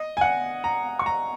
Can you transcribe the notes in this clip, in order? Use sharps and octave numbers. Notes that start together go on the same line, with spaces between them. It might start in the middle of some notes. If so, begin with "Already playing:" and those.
Already playing: D#5
G#5
F#5
A#5
C#6
A#5